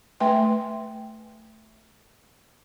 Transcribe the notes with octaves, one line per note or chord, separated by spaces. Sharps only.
A3 B4 E5 G5 C6